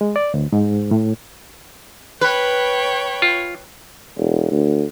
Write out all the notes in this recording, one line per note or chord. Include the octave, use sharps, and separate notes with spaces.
G#3
D5
D2
G#2
A2
B4 C#5 G5 B5
F4
E1
D2